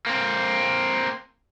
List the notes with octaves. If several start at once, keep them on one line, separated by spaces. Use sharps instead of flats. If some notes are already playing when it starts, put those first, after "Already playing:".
A#3 C4